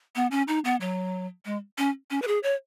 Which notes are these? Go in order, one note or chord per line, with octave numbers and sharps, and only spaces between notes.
B3
C#4
D#4
B3
F#3
G#3
C#4
C#4
B4
G#4
C#5